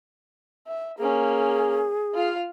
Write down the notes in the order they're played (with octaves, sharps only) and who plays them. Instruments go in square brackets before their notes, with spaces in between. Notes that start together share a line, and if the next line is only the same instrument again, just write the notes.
[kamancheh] E5
[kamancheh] A#3 C#4 [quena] G#4
[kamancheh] F4 F5